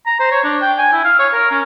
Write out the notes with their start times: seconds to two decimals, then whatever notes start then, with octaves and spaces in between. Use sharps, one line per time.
0.06 A#5
0.20 C5
0.31 C#5
0.44 D4
0.61 G5
0.78 G#5
0.92 E4
1.04 F5
1.19 C#5
1.33 A#4
1.51 C#4